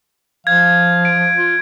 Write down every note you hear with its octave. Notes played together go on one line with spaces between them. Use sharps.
F3 F5 G#6
D7
F4